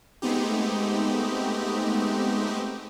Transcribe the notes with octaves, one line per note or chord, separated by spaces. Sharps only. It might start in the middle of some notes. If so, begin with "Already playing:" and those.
G#3 A3 B3 C4 D#4 G4